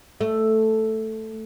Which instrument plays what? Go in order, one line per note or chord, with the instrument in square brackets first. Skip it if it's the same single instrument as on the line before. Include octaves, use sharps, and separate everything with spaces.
[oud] A3